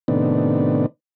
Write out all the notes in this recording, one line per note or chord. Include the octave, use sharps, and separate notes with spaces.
A2 C3 D#3 B3 D4